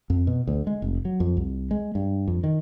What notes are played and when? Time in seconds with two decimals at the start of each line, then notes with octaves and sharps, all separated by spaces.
0.10 F2
0.27 B2
0.47 D2
0.67 G#3
0.82 F1
1.05 F#3
1.20 F2
1.37 C2
1.71 G#3
1.95 G2
2.27 F2
2.44 D#3